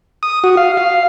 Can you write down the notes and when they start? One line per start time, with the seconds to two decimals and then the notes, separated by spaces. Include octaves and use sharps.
0.23 D#6
0.44 F#4
0.57 F5
0.77 F5